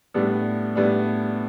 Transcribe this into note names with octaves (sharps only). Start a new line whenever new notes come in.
A2 G3 B3 D4
A2 G3 B3 D4